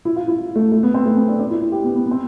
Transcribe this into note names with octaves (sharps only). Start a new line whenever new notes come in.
E4
F4
E4
A3
A3
B3
C4
A3
C4
D4
D4
E4
E4
G4
B3
B3
B3
C4